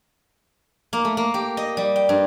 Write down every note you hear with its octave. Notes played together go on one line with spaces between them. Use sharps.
A#3
A3
A#3
G4
D#5
G3
G5
G2